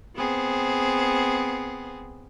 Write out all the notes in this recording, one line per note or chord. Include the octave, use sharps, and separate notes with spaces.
B3 C4 G#4